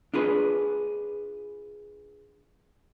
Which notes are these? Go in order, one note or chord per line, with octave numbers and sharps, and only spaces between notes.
D4 F4 G#4 B4